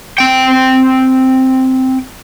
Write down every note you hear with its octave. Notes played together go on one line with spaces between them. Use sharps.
C4 G5